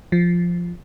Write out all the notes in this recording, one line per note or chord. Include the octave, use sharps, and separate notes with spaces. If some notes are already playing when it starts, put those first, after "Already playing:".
F3